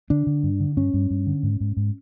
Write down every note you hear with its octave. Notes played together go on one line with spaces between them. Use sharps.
D3 D4
D3
G2
D3
G2 C#4
G2
G2
D3
G#2
G#2
G#2